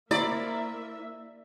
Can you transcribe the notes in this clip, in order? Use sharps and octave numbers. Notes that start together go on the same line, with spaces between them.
A#3 E4 C5 D5 E5 A#5